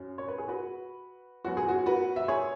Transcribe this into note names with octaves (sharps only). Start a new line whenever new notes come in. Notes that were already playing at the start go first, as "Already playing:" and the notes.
Already playing: F#2 F#3 C#4
C#5
B4
G#4
F#4 B4
F#2 F#3 B3 F#4
G#4
F#4
F#4 B4
E5
G#4 C#5